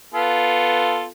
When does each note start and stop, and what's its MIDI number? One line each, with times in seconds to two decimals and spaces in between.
0.14 1.07 59
0.14 1.07 65
0.14 1.07 69